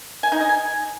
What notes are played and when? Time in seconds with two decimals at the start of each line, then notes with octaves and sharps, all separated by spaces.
0.23 G#5
0.32 D#4
0.40 D#5
0.49 G#5